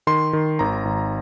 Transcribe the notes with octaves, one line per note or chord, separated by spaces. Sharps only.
D#3 C6
D#3
G#1 A#5
G#1